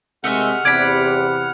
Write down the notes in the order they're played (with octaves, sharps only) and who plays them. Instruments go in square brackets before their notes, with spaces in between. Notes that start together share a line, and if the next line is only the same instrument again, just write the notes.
[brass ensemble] C3 D#3 G#3 [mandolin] A3 D#5 E5 [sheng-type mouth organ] F#5 F6
[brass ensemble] E2 C3 [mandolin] D5 B5 [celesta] G#6 D7